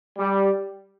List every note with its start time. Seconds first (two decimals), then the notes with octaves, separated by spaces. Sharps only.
0.18 G3